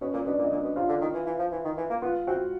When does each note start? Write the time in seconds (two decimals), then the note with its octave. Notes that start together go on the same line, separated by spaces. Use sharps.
0.01 B2 C#4 C#5
0.13 A#2
0.25 B2 D4 D5
0.39 A#2
0.44 D#5
0.51 A#2 D4 D5
0.64 B2
0.76 C3 F4 F5
0.89 D3
1.01 D#3
1.14 E3
1.26 E3
1.39 F3
1.52 E3
1.65 D#3
1.77 E3
1.90 A#3
2.02 B3 F4 F5
2.27 C4 F#4 F#5